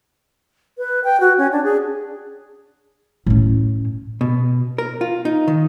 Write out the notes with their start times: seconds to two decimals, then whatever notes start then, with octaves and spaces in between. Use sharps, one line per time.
0.78 B4
1.04 G5
1.20 F#4
1.38 C#4
1.52 D4
1.64 G#4
3.26 A2 C#4
4.21 B2
4.78 A#4
5.01 F4
5.25 D#4
5.48 D#3